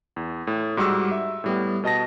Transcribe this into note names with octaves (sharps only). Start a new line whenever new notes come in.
E2
A2
G#2 G3 F#4 C#6 E6
E5
A2 G3 B3
B2 D#5 A5 A#6